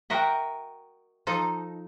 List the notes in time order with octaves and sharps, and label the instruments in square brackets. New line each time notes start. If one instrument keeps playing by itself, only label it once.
[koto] F#4 A#4 D#5 [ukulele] E5 G5
[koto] F3 D#4 A4